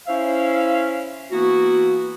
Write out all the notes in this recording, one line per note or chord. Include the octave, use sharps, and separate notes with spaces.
C#4 E4 C5 E5 F5
E3 A#3 B3 E4 F#4